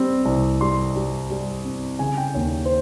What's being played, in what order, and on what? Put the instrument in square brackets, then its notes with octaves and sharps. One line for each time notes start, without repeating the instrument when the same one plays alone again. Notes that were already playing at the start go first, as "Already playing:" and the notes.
Already playing: [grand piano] G3 C4
C2
G3 C6
G3
G3
C4
C#3 G#5
G5
D#2 C#5
C5